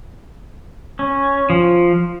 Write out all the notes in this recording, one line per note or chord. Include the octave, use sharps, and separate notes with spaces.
C#4
F3